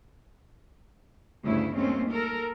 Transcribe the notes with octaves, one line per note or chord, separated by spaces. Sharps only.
D2 G2 C#3 A3 E4
D#2 A3 C4 C#4
A4 A#4